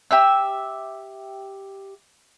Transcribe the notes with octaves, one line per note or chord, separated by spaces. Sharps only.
G4 E5 E6